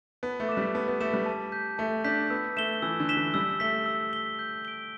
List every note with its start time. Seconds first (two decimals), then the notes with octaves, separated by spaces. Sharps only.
0.23 B3 A5
0.40 A3
0.49 D6 B6 E7
0.57 G3
0.75 B3 A5
0.88 B3
1.01 A3 D6 B6 E7
1.14 G3
1.26 A5
1.52 G6 B6
1.78 A3 A5
2.04 D4 G6 B6
2.30 B3 E6
2.56 A3 B6 E7 G7
2.82 E3 E6
3.00 D3
3.09 B6 E7 G7
3.17 E3
3.34 G3 E6
3.60 A3 B6 G7
3.86 E6
4.13 B6 G7
4.39 G6
4.65 D7 G7